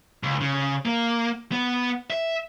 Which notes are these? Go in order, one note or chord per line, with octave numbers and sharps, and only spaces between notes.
C#2
C#3
A#3
B3
E5